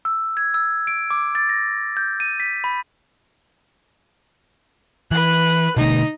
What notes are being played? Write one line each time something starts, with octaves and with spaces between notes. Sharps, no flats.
E6
G#6
E6
D7
D6
A6
A#6
G6
D#7
B6
B5
E3 B4 F#6
B2 D3 A3 D#4